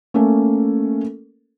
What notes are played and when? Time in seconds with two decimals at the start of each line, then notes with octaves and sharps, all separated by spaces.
0.14 A3 A#3 C#4 A4 A#4